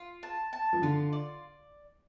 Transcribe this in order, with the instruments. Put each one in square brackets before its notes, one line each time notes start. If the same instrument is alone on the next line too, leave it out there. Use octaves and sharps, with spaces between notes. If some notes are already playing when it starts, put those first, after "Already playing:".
Already playing: [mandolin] F4
A5
A5
[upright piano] F3
[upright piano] D3 [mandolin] F4
[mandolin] D5